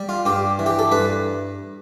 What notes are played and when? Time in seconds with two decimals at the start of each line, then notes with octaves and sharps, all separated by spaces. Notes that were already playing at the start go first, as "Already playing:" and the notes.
Already playing: G3
0.09 F4
0.26 G2 G4
0.59 E3
0.66 G4
0.79 A4
0.91 G2 B4